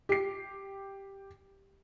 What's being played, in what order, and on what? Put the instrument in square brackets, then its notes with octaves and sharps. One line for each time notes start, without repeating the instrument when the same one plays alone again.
[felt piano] G4 C7